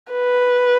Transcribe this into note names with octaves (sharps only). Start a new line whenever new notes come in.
B4